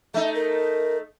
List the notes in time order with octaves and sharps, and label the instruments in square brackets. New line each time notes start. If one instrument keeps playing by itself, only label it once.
[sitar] A3 D#4 [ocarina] E5
[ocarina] A#4